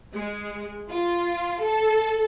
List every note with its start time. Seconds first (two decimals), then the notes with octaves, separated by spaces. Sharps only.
0.14 G#3
0.90 F4
1.61 A4